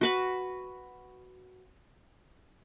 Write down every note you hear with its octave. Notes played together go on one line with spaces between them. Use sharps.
F#4 B4 B5